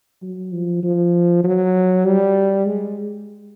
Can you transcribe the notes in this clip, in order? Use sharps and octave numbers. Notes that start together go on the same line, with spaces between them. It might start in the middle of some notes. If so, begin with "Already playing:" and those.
F#3
F3
F3
F#3
G3
G#3